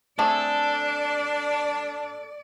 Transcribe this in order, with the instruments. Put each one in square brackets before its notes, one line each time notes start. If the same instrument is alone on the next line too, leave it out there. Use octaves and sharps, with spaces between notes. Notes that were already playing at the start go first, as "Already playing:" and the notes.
[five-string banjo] A3 C4 G#4 [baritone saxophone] D4 [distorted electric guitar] A4 [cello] D5